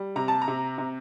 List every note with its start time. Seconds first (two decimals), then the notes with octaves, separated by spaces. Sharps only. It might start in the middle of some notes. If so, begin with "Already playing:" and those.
Already playing: G3
0.16 C3 A#5
0.28 A5
0.42 A#5
0.48 C3
0.78 C3